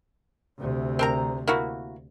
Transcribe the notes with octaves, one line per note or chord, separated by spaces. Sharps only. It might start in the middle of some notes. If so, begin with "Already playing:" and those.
D2 C3
C4 A#4 A#5
A#3 E4 F#4